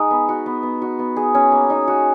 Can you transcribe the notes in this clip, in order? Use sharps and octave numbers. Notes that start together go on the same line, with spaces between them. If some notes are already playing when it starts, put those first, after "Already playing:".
Already playing: G#3 D#4
B3
F#4
B3
B3
F#4
B3
G#4
C#4
A#3
D#4
F#4